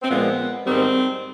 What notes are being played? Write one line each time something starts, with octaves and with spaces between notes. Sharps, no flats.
C4
A#2 F3 G#3 B3
G#2 D#3 G3 C4